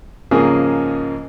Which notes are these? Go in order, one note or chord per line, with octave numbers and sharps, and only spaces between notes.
G#2 C#3 F3 A#3 G#4